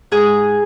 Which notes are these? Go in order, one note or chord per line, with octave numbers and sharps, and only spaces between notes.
G#2 G#4